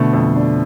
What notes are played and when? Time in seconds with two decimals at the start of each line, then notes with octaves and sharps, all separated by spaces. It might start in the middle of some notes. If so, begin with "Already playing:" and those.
Already playing: B2 D3 A3
0.13 F2
0.36 D4